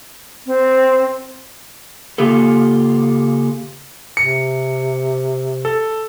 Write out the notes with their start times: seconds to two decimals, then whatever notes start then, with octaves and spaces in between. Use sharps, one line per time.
0.46 C4
2.18 C#3 A#3 F4 G4 A4
4.17 C3 C#7
5.65 A4